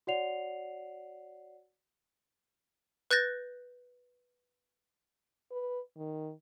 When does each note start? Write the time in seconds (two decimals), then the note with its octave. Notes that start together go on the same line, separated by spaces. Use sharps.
0.07 F#4 C#5 D5 F#5 C7 F7
3.11 B4 F#6 G6 A6 A#6
5.52 B4
5.97 D#3